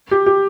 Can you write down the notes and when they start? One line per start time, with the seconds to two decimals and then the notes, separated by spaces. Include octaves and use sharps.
0.11 G4
0.26 G4